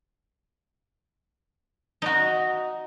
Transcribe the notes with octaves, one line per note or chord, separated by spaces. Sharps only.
D#4 F#4